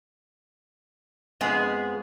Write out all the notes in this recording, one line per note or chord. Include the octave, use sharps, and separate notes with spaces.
F2 G#3 B3 G#4